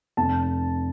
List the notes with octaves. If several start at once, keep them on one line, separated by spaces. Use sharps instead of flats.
F1 A5